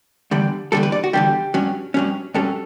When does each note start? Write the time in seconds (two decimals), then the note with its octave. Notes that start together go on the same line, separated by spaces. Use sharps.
0.31 E2 D3 G3
0.72 E2 D3 G3 A4
0.83 B4
0.92 D5
1.04 F#4
1.13 E2 D3 G3 G4
1.54 G2 F#3 C#4
1.94 G2 F#3 C#4
2.34 G2 F#3 C#4 A4